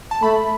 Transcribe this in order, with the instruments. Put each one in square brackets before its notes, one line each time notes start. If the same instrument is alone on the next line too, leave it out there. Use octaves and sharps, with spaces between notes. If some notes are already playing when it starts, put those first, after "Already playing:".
[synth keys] A5
[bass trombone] A3 [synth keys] B5